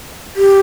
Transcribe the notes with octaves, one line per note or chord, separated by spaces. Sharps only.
G4